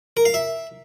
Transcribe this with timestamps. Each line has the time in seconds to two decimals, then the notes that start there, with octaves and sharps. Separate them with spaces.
0.17 A#4
0.25 F5
0.34 E5